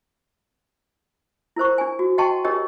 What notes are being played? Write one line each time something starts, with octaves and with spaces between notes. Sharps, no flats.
E4 A#4 C5 C#6
D4 G#5
F#4
D#5 F#5 G5 A5 C6 C#6
D4 G4 A#4 C#5 D#5